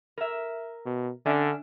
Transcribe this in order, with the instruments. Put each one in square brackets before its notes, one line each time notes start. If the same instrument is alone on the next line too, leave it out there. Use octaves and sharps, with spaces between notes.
[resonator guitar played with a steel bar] A#4 E5
[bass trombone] B2
[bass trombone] D3 [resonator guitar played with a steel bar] C#4 D4 E5